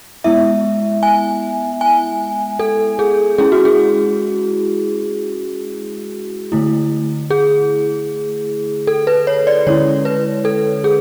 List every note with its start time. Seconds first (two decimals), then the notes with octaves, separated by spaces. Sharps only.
0.24 G#3 B3 E4 E5
1.03 G#5
1.81 G#5
2.59 A4
2.99 G#4
3.38 G#3 C#4 E4 G#4
3.52 F#4
3.65 G#4
6.52 D3 A3 E4
7.30 G#4
8.87 A4
9.07 B4
9.27 C#5
9.47 D5
9.67 D3 G#3 C#4 E4 C#5
10.05 B4
10.45 A4
10.84 G#4